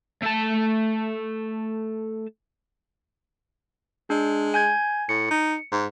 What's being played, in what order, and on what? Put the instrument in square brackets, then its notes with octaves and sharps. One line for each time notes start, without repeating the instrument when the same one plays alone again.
[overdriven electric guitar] A3 A5
[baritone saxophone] G#3 [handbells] D4
[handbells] G#5 G6 G#6
[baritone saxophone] A2 [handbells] C#7
[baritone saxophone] D#4
G#2